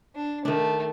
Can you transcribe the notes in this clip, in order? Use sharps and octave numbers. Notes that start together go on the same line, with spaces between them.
D4
D#3 A3 D4